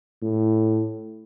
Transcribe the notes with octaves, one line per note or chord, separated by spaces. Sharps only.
A2